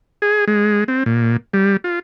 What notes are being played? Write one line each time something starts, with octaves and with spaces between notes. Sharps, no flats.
G#4
G#3
C4
A#2
G3
F4